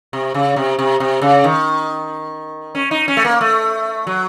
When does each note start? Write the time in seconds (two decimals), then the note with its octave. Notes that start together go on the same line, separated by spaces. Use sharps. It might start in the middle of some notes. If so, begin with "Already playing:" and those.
0.13 C3
0.34 C#3
0.56 C3
0.79 C3
1.00 C3
1.22 C#3
1.44 D#3
2.75 C#4
2.91 D#4
3.08 C#4
3.17 A3
3.25 A#3
3.41 A3
4.07 F#3